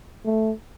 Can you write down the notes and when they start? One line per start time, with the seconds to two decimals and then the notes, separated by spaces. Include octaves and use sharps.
0.25 A3